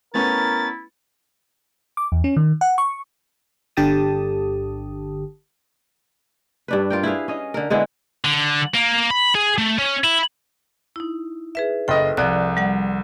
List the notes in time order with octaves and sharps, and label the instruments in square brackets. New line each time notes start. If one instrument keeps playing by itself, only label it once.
[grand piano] A3 B3 C#4 [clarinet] E4 [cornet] A#4 [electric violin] A6
[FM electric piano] D6
E2
C#4
D#3
F#5
C#6
G1 D3 G4 A5 D#6
[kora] G2 D4 B4
F4 A#4 G5
E4 G#4 B4 F5
C#4 D#5
D3 A#4
D3 G#3 B3 E4
[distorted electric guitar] D3
A#3
B5
G#4
A3
C#4
E4
[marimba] D#4 E4
G#4 B4 E5
[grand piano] F#1 D#5 [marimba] A4 G5
[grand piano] C2 [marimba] F3 D5 F#6
[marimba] G3 F#5